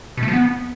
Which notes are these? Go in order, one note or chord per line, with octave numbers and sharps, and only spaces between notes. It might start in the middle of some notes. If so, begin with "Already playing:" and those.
B2
A3
F3
B3